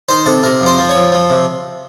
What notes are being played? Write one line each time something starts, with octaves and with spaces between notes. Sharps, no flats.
D#3 C5
C3 A4
C3 A#4
F2 C5
F3
C#5
F2
F3
C3